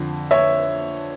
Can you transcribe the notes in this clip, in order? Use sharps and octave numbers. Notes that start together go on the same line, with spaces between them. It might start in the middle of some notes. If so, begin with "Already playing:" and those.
Already playing: F2 D3
C#5 E5